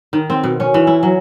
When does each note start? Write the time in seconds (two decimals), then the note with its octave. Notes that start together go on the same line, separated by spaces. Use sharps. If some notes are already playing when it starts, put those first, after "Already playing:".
0.13 D#3
0.30 C4
0.43 B2
0.60 C#4
0.74 E3
0.87 E4
1.03 F#3